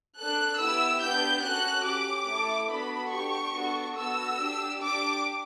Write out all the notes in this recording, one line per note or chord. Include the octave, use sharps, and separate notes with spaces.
D4 A4 F#6
B3 E4 G4 E6
B3 D4 G4 G6
C#4 F#4 A4 F#6
C#4 G4 D6
A3 E4 A4
B3 D4 F#4 A4 B5
D4 G4 C#6
B3 D4 F#4 A4
B3 F#4 A4 E6
D4 G4
D4 G4 D6